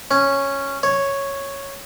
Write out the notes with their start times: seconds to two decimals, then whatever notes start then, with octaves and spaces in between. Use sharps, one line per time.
0.11 C#4
0.83 C#5